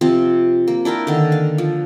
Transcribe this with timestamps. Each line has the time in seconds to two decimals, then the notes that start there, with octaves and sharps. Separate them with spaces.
0.01 C3 F3 C4 F4
0.68 A#3
0.85 D4 E4 A#4 G5
1.07 D3 D#3
1.32 F5
1.58 F3